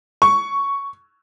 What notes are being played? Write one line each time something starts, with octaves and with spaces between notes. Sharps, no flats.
C#6